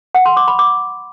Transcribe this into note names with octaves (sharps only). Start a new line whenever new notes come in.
F#5
C6
D6
B5
D6